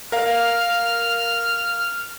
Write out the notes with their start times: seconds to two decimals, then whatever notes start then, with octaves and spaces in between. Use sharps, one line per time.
0.12 A#4 F5 F6